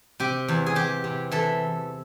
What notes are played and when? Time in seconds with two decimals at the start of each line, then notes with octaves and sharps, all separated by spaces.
0.20 C3 G4
0.48 E2
0.66 G#4
0.76 E2 G4
1.04 C3
1.32 E3 A4